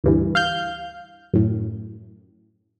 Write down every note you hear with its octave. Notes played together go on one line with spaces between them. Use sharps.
D2 G2 E3
F5 F6 G6
F#2 A2